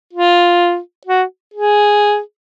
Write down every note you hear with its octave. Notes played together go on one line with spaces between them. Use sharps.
F4
F#4
G#4